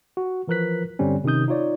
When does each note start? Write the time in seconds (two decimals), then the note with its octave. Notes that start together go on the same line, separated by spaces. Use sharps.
0.17 F#4
0.47 E3 F3 A#4 B4 F#6 B6
0.99 G2 D3 G3 C4 C#4
1.24 C3 D#3 C#4 D#4 D#6 G6
1.48 D#4 F4 C#5 D5